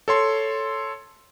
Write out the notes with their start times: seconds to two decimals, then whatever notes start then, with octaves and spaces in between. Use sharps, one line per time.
0.08 A4 C#5 C6